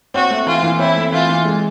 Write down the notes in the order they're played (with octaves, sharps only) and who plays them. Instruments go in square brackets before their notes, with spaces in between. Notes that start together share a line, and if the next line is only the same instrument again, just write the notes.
[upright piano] C4 [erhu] F#4
[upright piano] A3
[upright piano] E3 [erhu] F4
[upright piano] E3
[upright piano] C4 [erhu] E4
[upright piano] A3
[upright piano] E3 [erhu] F4
[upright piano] E3
G#3